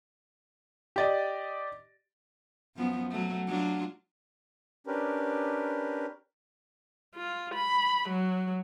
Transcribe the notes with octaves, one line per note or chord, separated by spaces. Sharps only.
G4 D5 D#5
F#2 F3 B3
F#3 A3
F#3 D4 F4
C#4 D4 G4 A#4 B4
F4
B5
F#3